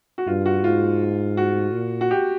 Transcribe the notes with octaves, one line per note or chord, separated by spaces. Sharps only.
F#4
G2 F4
F#4
G#2 F4
F#4
A#2
F#4
G4